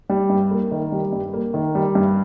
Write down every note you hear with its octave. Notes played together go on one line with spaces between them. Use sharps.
G3
G2
A#3
D#3
G3
G2
A#3
D#3
G3
G2